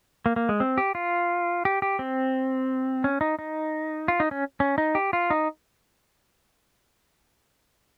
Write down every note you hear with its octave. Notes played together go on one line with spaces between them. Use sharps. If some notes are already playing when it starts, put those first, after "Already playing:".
A#3
A#3
G#3
C4
G4
F4
G4
G4
C4
C#4
D#4
D#4
F4
D#4
C#4
C#4
D#4
G4
F4
D#4